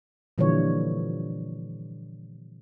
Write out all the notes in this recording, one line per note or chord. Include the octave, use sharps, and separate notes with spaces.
A#2 D3 E3 F3 G3 C#5